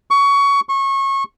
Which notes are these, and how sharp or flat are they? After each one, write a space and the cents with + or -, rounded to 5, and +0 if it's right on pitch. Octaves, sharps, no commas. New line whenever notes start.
C#6 +20
C#6 -25